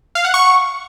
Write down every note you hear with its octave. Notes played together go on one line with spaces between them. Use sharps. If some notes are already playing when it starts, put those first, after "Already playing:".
F5
F#5
C#6